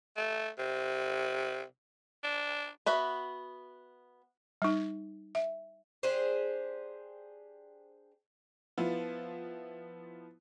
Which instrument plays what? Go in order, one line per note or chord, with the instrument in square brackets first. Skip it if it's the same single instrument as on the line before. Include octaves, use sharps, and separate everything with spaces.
[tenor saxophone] A3
C3
D4
[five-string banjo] B3 F#4 E5
[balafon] G3 D#4
E5
[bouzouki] D4 G4 G#4 C5
[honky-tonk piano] F3 B3 E4 F4